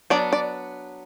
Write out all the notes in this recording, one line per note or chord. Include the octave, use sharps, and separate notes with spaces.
F#3 B3 D4 D5
D5